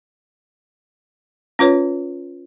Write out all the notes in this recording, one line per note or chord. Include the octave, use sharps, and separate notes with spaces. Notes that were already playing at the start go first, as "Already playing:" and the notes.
C#4 F4 B4 C#5